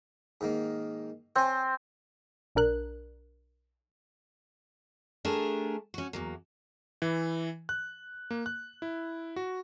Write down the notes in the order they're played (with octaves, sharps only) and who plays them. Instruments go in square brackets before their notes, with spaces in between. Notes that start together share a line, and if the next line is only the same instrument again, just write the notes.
[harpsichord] G#2 D#3 A#3
[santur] C4 [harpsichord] C#5 G#5
[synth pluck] B1 D4 A#4 F#6
[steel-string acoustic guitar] A3 D4 G4 G#4 A#4
C#4 F#4
E2 F#3 A#3
[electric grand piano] E3
F#6
A#3
F#6
E4
F#4